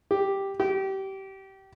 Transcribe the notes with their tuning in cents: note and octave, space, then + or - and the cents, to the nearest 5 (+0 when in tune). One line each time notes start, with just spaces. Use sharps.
G4 +0
G4 -25